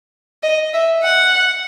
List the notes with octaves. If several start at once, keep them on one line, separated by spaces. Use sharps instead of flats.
D#5
E5
F#5